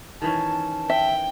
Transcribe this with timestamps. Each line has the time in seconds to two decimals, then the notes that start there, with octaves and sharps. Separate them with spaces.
0.22 D#3 E3 C#4 A5
0.90 E5 G5